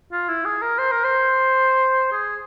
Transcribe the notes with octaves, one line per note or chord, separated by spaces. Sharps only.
F4
E4
G#4
A#4
C5
A#4
C5
G#4